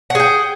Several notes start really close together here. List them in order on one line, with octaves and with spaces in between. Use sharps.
F#5 G#4 G5